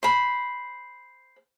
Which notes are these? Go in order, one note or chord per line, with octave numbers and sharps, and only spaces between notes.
C5 B5